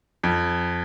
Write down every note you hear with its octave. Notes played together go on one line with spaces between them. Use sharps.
F2